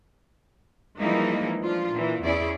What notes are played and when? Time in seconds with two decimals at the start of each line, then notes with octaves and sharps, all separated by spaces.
0.98 E3 F3 G3 G#3 A#3 D#4
1.60 F3 D4 F4
1.92 A#2 E3
2.23 E2 C#4 E4 G#4 D5